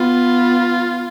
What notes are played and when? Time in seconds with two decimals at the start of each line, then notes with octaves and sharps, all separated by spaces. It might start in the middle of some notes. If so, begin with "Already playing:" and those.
Already playing: B3 F4